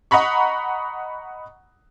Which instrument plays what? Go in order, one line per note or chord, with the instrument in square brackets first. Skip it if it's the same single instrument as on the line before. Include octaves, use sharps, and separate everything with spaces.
[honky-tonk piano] D#5 F#5 A#5 B5 C#6